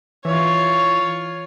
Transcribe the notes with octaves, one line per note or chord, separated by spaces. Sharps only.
E3 F4 C#5